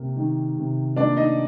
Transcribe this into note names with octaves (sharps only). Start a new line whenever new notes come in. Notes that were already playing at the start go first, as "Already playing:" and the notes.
Already playing: C3 A#3
D#3
C3
A#3 D4 D5
D#4 D#5